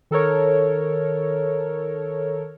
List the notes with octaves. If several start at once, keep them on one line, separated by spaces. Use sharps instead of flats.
D#3 A4 A#4 C#5